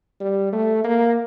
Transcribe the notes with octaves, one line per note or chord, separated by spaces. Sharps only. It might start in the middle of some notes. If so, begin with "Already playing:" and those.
G3
A3
A#3